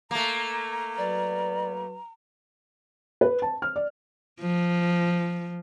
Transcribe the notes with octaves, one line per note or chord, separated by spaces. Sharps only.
A3 A#3 A#5
F#3 B4 D5
B4
A5
F6
D5
F3